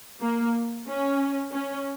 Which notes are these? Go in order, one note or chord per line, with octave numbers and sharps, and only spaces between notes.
A#3
C#4
C#4